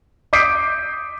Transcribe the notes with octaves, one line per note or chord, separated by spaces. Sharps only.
D6 D#6 G6 B6 C7 D7